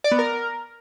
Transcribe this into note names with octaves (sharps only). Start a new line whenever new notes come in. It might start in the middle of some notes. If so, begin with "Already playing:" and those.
D5
B3
A#4